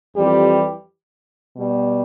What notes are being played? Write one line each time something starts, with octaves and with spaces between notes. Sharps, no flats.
F2 E3 G3 G4
B2 G3